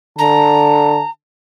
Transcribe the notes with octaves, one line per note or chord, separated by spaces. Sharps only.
D3 A5 A#5